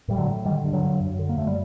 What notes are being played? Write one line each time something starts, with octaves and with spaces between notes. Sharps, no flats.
A2 G3
D3 F#3
A2
D3 D#3 G3
G2
D3 F#3
G2
F#2
D3
A#3
F#2 A3
G3